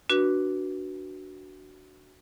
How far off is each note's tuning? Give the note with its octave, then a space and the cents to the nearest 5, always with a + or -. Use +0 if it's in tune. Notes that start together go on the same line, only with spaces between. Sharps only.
D4 +0 F#4 +10 B4 -20